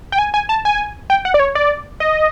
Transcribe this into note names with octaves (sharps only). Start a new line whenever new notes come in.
G5
G#5
G#5
A5
G#5
G5
F#5
D5
C#5
D5
D#5